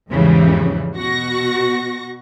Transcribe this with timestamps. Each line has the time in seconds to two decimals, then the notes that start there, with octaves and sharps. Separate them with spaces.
0.10 E2 G#2 C#3 E3 F3 G3
0.95 B2 F#4 C#6 A#6